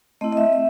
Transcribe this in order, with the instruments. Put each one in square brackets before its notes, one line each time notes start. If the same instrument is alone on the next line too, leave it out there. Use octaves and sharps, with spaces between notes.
[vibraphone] A3 C4 E4 D#5
D#5
E5
E5